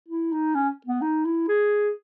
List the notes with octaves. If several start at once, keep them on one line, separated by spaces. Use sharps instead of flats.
E4
D#4
C#4
B3
D#4
E4
G#4